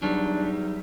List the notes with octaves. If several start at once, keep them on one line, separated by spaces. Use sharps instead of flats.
E2 F#3 G3 D4 D#4